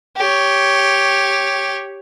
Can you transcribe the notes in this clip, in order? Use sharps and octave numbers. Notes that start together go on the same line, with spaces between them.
G4 C#5